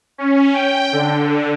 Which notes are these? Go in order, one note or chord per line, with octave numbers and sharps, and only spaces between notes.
C#4
G5
D3